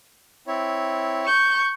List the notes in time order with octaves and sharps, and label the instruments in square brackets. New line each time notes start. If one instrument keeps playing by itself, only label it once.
[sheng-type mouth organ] C4 E4 C#5
[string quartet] C#6 G6